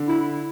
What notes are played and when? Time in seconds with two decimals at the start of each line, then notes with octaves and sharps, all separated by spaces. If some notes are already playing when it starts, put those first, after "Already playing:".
Already playing: D3
0.08 E4